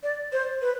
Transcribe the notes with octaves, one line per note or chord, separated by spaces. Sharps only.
D5
C5
B4